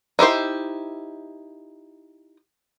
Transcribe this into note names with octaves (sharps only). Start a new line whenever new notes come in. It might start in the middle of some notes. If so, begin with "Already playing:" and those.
D#4 E4 G4 C5